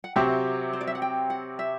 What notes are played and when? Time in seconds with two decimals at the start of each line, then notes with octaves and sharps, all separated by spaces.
0.04 F#5
0.16 C3 F#3 C4 G4 E5
0.73 C5
0.81 D5
0.87 E5
0.95 F#5
1.02 G5
1.30 F#5
1.59 E5